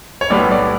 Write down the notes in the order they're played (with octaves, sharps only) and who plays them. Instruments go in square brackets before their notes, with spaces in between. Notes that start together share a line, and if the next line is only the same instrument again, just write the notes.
[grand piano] C#5
B1 A2 G3 B3 D5
D5